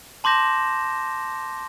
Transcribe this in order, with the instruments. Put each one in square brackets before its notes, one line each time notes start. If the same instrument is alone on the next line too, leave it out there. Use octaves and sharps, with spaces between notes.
[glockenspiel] A5 C6 D6 G6 A#6 E7